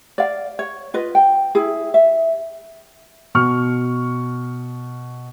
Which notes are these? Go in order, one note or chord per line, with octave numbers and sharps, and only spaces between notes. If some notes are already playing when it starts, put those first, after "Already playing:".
D5 F5
C#5
F4 B4 D#5
G5
E4 G#4
E5
B2 C#6 F6